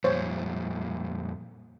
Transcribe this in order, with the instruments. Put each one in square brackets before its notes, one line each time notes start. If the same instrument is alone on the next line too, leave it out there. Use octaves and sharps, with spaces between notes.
[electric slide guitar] F2 A#2 G3 [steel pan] C5 C#5